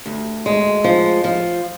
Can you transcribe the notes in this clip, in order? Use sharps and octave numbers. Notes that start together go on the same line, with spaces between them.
D2
G#3
F3
F3